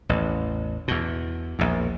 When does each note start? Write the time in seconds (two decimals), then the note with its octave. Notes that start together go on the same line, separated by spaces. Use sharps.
0.09 A1 E2
0.88 E2 B2
1.59 A#1 E2